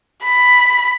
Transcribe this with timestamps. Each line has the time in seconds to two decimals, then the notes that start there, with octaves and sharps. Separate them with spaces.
0.24 B5